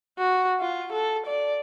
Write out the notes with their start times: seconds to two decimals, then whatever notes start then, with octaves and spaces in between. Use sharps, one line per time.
0.19 F#4
0.61 F4
0.93 A4
1.26 D5